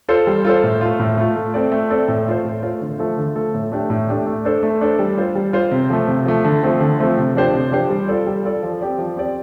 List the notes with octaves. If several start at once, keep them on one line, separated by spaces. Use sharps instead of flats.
F4 A4 C5
G3
F4 A4 C5
A2
A3 F4
A2
A3 F4
A3
C4 A4 D5
A3
C4 A4 D5
A2
A3 F4 C5
A2
A3 F4 C5
D3
F3 A3 F4 A4
D3
F3 A3 F4 A4
A2
A3 D4 G4
A2
A3 D4 G4
A3
D4 A4 C5
A3
D4 A4 C5
G3
F4 C5
G3
F4 C5
C3
F3 A3
C3
F3 A3
D3
F3 A3 C4
D3
F3 A3 C4
C3
F3 D4 G4 C5
C3
F3 D4 G4 C5
G3
F4 A4 D5
G3
F4 A4 D5
F3
C4 G4 D5
F3
C4 G4 D5